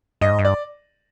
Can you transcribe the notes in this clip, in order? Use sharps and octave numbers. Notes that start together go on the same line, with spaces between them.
G2 D#5
G#2
G2
D5